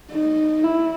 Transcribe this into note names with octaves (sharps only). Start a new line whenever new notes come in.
D#4
E4